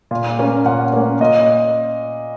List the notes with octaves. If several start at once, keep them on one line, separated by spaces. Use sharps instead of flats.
A#2
A#3 C#4
A#2 F#5
A#3 C#4
A#2 D#5